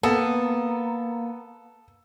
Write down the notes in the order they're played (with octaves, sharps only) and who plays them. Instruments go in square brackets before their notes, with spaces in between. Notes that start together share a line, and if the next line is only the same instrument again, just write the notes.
[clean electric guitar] A#3 [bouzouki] B3 [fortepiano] A4